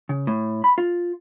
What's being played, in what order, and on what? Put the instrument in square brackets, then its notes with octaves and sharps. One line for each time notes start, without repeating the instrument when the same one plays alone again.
[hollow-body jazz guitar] C#3
A2
B5
F4